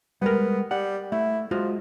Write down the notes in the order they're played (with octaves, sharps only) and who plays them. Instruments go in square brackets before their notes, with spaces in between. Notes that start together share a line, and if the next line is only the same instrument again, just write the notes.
[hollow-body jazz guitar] G3 G#3 A#4 [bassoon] B3
[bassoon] G3 [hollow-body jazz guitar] F#5
[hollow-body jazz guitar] A3 [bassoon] E4
[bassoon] F3 [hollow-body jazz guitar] G#3 F4 F#4